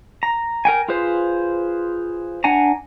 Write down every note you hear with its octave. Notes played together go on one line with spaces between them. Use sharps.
A#5
A#4 G5 G#5
F4 G#4 B4 C5
D4 F#5 G#5 A#5